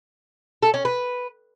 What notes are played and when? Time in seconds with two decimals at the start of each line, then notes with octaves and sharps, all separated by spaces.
0.63 A4
0.74 C#4
0.85 B4